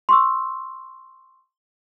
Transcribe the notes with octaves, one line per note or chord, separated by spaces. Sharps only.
C6 C#6 E6